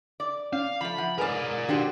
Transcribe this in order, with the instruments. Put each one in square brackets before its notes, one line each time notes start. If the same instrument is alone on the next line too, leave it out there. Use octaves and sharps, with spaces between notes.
[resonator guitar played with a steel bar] D5
[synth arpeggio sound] C#4 [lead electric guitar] F5
[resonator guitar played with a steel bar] F3 A3 [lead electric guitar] B5
[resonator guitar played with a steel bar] F3 [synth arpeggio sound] F#5
[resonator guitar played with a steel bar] G#2 G#4 [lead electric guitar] A#4 D5 [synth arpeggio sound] B4 G#5 F6
[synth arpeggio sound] D#3 D4 C7 [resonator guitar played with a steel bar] F#4 G4 C5